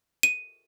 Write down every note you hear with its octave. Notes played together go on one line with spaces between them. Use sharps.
D#7